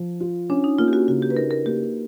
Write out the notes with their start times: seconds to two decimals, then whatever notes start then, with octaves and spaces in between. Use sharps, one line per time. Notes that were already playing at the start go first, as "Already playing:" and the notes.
Already playing: F3
0.20 F4
0.50 C#4 D4
0.64 D#4
0.78 A#3 F4
0.88 G4
0.93 F#4
1.08 C#3 F#4
1.22 G4
1.30 B4
1.36 D#4 A#4
1.51 A#4
1.66 A#3 G4